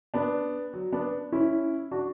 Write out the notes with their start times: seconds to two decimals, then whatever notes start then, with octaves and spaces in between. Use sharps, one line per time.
0.14 B3 D4
0.73 F#3
0.92 B3 D4
1.32 C#4 E4
1.91 D4 F#4